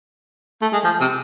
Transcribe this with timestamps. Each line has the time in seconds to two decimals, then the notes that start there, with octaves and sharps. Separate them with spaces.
0.62 A3
0.73 G#3
0.84 F3
1.01 C3